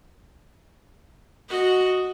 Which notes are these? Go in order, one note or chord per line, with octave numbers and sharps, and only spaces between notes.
F#4 D#5